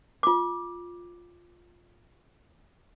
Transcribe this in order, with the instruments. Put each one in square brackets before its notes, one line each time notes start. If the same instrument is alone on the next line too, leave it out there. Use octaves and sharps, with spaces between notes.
[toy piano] F4 D6